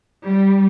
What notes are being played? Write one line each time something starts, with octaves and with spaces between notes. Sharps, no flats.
G3